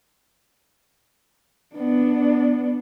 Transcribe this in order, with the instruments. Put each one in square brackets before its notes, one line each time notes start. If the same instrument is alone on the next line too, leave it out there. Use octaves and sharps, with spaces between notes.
[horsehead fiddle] B3 D4